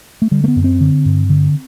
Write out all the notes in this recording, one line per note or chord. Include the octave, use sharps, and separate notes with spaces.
A3
D3 G3
A3
B3
F#2
C4
D3
G2
D3